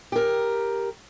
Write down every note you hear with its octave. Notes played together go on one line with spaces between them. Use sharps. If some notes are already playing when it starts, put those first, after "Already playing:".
G4 A#4